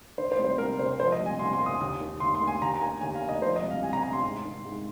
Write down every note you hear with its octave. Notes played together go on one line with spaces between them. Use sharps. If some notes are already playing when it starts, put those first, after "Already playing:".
D#3 C5
C5
C2
C5
C2 A#4
C3 C5
F3 C5
D#5
C2
G#5
C2 C6
C6
A#2
D#6
D#2 D#6
D#3
D#2 C6
C6
D#3
G#5
D#2 A#5
A#5
D#3 G#5
D#2 G#5
F5
D#3
D#5
F3 C5
D#5
C2
F5
C2 G#5
A#5
C3 A#5
C6
G#2
D#3
G#2